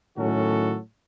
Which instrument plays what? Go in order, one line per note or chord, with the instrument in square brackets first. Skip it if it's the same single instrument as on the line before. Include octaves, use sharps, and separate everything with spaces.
[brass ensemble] A2 D#3 F#3 C#4 F#4 A4